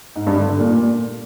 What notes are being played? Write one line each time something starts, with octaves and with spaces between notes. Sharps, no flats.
G#2
G2
D3
G2
A#2